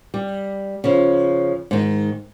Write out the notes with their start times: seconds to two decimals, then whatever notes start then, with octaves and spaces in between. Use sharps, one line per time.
0.14 G3
0.84 C#3 F3
1.71 G#2 D#3